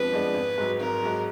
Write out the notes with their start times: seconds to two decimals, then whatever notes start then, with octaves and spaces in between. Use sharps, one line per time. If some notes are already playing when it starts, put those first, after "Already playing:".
Already playing: F2 F3 G#3 B3 D4 B4
0.12 F3 G#3 B3 D4
0.34 G#1
0.58 G#2 F#3
0.80 G#1 A#4
1.03 G#2 F#3